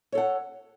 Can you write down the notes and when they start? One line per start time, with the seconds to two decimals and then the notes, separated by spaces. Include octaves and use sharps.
0.12 C#5
0.15 A4
0.18 F#5